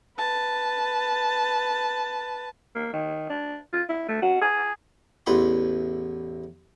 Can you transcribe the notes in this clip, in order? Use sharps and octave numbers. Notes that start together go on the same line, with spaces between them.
B4 A5
A#3
D#3
D4
F4
E4
A3
F#4
G#4
A1 E2 B4 F#5 C6